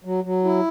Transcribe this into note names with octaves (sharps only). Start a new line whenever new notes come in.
F#3
F#3
E4